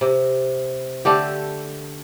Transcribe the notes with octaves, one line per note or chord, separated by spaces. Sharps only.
C3
D3 A3 G4